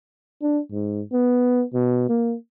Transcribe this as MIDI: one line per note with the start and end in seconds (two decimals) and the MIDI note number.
0.42 0.60 62
0.72 1.03 44
1.13 1.64 59
1.74 2.09 47
2.09 2.35 58